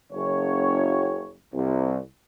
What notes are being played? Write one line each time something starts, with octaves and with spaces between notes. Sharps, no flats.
F#1 C#5
C2